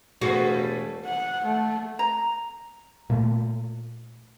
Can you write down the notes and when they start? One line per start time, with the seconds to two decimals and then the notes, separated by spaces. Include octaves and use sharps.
0.21 E1 G3 A3 B3 F#4 G#4
1.05 F#5
1.44 A3
1.99 A#5
3.10 A#2 A3